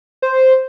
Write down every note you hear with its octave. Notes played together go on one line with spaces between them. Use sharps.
C5